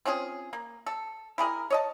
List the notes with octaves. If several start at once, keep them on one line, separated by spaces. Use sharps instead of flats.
C4 C#4 F4 G#4
A#3
A4
E4 G4 G#4 A#4
C#5 D#5 A5